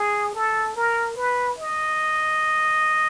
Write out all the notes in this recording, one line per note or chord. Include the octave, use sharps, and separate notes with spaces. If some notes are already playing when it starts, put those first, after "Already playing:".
Already playing: G#4
A4
A#4
B4
D#5